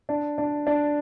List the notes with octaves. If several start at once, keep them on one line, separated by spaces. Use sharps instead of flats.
D4
D4
D4